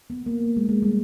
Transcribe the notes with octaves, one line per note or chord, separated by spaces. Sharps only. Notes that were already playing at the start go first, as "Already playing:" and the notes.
B3
A#3
G#3
G#3
G3